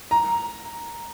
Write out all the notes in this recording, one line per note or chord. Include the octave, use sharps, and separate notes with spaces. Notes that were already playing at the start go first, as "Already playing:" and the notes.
A#5